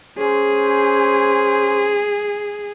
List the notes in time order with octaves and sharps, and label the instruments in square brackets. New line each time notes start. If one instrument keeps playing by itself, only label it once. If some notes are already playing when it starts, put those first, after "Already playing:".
[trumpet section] C#4 C5 [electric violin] G#4